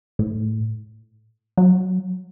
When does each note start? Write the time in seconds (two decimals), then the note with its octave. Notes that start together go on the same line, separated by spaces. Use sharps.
0.19 A2
1.58 F#3